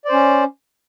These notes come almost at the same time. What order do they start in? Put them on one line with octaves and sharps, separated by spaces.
D5 C5 C#4